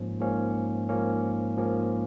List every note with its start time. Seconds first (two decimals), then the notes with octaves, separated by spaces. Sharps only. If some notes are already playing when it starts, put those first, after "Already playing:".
Already playing: G#2 F3 A#3 C#4
0.20 G#2 F3 A#3 C#4
0.89 G#2 F3 A#3 C#4
1.57 G#2 F3 A#3 C#4